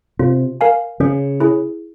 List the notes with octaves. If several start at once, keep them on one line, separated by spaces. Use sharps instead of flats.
C3 F4
A#4 F5 G#5
C#3 C#4
E4 G#4